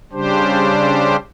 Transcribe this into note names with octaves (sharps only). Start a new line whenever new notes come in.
C#3 G3 D4 G4 C5